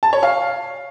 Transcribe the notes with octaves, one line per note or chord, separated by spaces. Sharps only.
A5
C#5
F5